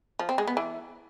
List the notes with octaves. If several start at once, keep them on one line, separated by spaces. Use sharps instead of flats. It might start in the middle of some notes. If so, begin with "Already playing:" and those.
F3
C4
G#3
B3
E3